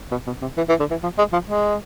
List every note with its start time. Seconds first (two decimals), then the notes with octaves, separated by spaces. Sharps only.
0.11 B2
0.26 B2
0.42 C3
0.57 E3
0.69 E3
0.80 D3
0.90 E3
1.03 F3
1.18 G#3
1.33 F3
1.48 G#3